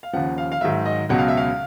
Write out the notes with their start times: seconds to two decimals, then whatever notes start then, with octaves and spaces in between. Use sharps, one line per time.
0.03 F5
0.13 D#2 C#3 F3 F#5
0.38 F5
0.52 F5
0.61 G#2 D#3 F#3 E5
0.85 D#5
1.09 C#2 B2 F#3 F#5
1.18 F5
1.28 E5
1.37 F5